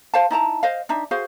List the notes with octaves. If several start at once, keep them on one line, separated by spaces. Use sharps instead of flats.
C5 F5 A5
D#4 E4 A5 A#5
C5 D#5 F5
D4 D#4 E5
F#4 G#4 C5 F5